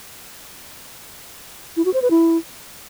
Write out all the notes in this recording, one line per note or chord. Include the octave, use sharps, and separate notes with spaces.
E4
F#4
C5
B4
E4